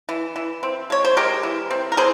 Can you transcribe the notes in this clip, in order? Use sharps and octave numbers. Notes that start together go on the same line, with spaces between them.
E3
E3
C4
G#3 C#5
C5
G#3 G4 A#4
E3
C4
A#4
E3 G#4 C5